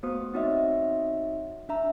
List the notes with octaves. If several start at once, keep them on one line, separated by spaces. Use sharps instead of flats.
A3 B3 F#4 C5 D#6
C4 D#4 F#4 C#5 D#5 E5
D4 E5 A#5